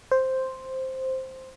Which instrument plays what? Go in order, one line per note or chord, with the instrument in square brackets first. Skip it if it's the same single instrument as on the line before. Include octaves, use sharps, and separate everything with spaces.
[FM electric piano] C5